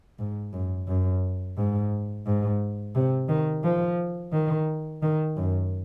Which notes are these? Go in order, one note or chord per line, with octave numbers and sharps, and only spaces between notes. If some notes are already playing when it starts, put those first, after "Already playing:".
G#2
F#2
F#2
G#2
G#2
C3
D#3
F3
D#3
D#3
F#2